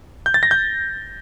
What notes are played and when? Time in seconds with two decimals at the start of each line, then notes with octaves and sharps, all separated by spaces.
0.26 G6
0.34 A6
0.43 A#6
0.51 G6